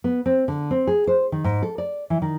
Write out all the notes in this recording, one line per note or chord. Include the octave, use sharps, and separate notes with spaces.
B3
C4
D3
C4
G#4
C5
D#3
G#2
A4
D5
E3
D#3